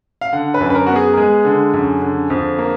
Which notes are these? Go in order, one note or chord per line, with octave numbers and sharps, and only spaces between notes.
F5
D3 F#5
B4
F#2
B4
A#4
B3 F#4
G#4
A#4
G#3 G#4
D3
F#2
D3
F2
A#3